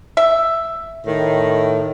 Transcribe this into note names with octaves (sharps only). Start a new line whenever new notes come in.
E5
A2 D#3